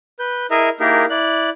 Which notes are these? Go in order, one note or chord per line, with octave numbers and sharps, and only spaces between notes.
B4 G6
E4 G#4 A#4 D#5 E5 A#5
A#3 D#4 E4 G4 G#4 A#4
E4 D5 F#6